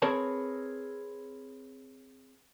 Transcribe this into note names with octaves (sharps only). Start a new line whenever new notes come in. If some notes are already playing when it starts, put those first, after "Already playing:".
C4 G#4 A#4 B4 C#5 A5